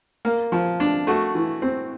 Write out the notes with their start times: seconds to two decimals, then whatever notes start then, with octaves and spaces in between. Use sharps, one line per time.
0.25 A#3
0.52 F3
0.80 D4
1.07 A3 F#4
1.35 E3
1.62 C4